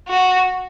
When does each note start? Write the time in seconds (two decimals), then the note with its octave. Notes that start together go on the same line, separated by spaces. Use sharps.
0.08 F#4